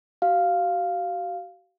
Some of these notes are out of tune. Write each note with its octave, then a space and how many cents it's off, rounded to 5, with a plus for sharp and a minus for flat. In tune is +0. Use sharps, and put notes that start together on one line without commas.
F#4 +40 F5 +0